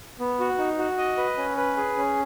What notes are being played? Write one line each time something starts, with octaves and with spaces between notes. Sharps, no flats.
B3
F#4
D#4
F#4
D#5
B4
C#4
B4
G#4
C#4